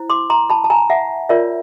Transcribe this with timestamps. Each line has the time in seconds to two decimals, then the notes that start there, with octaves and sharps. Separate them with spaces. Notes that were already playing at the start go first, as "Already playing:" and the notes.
Already playing: E4 C5
0.10 C6 D6
0.30 A#5 C6
0.50 A5 B5
0.64 A5
0.70 G#5 A#5
0.90 E5 F#5
1.29 F4 A#4 C#5 D5 E5